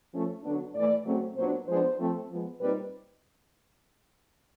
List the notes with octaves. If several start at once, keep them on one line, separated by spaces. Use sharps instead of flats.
F3 A3 C#4
D3 F#3 B3 D4
A2 E3 A3 D5
C#3 F#3 A3 C4
A#2 F#3 B3 D4 C5
F3 G#3 B3 D4 C5
F3 A3 C4
F3 G#3 B3
A#2 G3 C4 D#4 B4